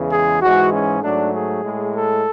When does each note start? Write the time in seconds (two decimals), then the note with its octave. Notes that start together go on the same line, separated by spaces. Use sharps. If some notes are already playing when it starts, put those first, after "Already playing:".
Already playing: E2 C#3 E3 G#3
0.11 G#4
0.41 G#2 E3 G#3 F#4
0.72 C#4
1.02 G#2 F#3 A3 D4
1.33 G#4
1.64 A2 G#3
1.94 A4